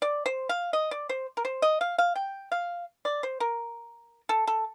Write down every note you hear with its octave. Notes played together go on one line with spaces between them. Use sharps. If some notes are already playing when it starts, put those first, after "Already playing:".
D5
C5
F5
D#5
D5
C5
A#4
C5
D#5
F5
F5
G5
F5
D5
C5
A#4
A4
A4